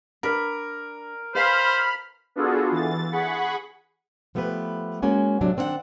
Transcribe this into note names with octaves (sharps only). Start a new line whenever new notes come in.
D4 A#4 B4
B4 C5 F5 G#5 B5 F6
B3 D4 F4 F#4 G#4 A4
E3 A6
G#4 F#5 B5 C#6
F3 A3 B3 G4 B4
G#3 A#3 C#4 F#4 G#5
A2 C3 F#3 D4
D#3 C4 D4 E4 F#5